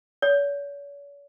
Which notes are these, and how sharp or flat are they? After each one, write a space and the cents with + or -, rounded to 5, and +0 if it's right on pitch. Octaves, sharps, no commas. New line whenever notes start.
C#5 +45